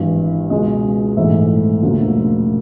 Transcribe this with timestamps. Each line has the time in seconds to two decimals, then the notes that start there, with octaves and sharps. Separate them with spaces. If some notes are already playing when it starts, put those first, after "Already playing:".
Already playing: G#1 G2 E3
0.50 C#2 B2 G#3 D#5
1.16 A#1 G#2 E3 A3 E5
1.82 E1 D2 C#3 F3 A#3